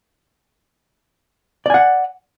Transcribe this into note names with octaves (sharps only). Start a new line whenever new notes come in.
D5 F#5 G#5